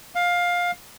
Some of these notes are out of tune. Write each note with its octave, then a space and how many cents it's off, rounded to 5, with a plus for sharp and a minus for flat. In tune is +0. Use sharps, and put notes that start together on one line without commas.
F5 +15